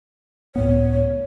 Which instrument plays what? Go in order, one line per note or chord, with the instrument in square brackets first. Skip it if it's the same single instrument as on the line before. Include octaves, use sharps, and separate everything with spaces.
[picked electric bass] C#2 A2 B3 [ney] C#5